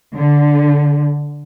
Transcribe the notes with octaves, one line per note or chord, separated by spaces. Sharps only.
D3